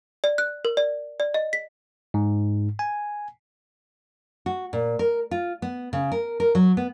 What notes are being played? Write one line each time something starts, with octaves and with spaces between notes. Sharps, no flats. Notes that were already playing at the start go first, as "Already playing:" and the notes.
D5
F#6
A#4
D5
D5
D#5
B6
G#2
G#5
F#4
A#2
A#4
F4
B3
C#3
A#4
A#4
F#3
B3